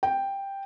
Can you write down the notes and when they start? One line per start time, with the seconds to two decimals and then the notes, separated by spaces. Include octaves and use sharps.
0.03 G5